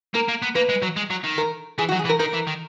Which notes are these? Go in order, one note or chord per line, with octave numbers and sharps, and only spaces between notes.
A#3 A#4
A#3
B3
A#3 B4
G#3
F#3
G#3
F#3
D#3
A#4
E3 G#4
F#4
F#3
G#4
E3
A#4
D#3 A#4
E3
D#3